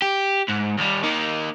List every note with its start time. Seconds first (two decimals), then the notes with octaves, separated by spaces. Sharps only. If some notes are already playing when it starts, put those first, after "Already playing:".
0.02 G4
0.48 G#2
0.78 D#2 G3
1.03 A#3 D#4